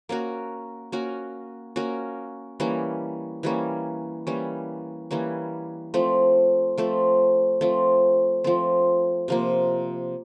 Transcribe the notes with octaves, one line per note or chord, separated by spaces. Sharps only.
A#3 C#4 F#4 A#4
A#3 C#4 F#4 A#4
A#3 C#4 F#4 A#4
E3 G3 A#3 C#4
E3 G3 A#3 C#4
E3 G3 A#3 C#4
E3 G3 A#3 C#4
F3 A3 C4
F3 A3 C4
F3 A3 C4
F3 A3 C4
C3 F3 A#3